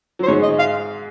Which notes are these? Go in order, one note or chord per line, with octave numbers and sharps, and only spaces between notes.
F#3
C5
G#2 G#3 C#5
D#5
F5